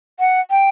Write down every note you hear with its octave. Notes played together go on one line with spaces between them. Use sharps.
F#5
G5